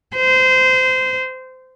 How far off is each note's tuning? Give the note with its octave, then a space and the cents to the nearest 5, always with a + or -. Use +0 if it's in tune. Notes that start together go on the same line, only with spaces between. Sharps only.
C5 -20